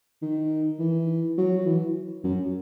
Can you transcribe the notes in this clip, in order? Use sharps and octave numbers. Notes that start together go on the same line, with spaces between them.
D#3
E3
F#3
E3
F#2